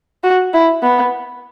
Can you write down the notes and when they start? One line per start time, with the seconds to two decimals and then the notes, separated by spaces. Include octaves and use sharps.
0.24 F#4
0.54 E4
0.83 B3